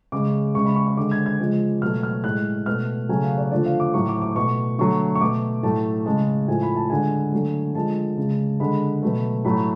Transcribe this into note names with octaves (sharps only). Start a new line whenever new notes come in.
C#3 G#3 D6
C#3 G#3 C#6
B5
C#6
C#6
D3 G#3 D6
G#6
G#6
C#3 F3 G#3
B2 F#3 A3 F6
F6
A2 G#3 F#6
B2 A3 F6
C#3 F#3 A3 G#5
F5
D5
D3 F3 A3 D5
F5
D6
A2 F#3 A3 C#6
D6
D6
B2 A3 C#6
D3 F#3 A3 C#6
C#6
B2 A3 D6
A2 F#3 A3 A5
C#3 G#3 A5
A2 F3 A3 G#5
B5
A5
D3 G#3 G#5
D3 F#3 A3
D3 F3 G#3 A5
C#3 G#3
D3 G#3 B5
B2 F#3 A3
A2 F#3 A3 B5